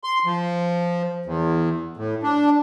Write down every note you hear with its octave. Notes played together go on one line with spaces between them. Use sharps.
C6
F3
E2
A2
D4